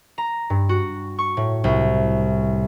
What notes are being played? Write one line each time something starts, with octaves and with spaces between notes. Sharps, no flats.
A#5
G2
F#4
C#6
A2
C2